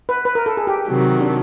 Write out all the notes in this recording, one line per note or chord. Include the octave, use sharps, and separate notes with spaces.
B4
B4
A#4
A4
G#4
G4
C3 D#3 F#3
D4